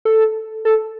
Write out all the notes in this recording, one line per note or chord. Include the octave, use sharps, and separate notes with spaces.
A4
A4